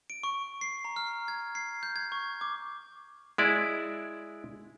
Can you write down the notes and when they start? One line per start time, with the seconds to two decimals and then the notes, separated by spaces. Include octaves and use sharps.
0.10 D7
0.23 C#6
0.61 C7
0.85 A#5
0.96 F6
1.28 G#6
1.55 C7
1.83 G6
1.96 G#6
2.12 C#6
2.41 D6
3.38 G#3 E4 D5